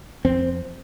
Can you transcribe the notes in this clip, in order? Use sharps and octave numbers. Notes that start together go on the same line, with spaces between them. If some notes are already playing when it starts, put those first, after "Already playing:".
F2 C4